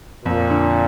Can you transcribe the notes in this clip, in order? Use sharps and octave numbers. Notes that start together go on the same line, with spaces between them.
F2 A#2
D3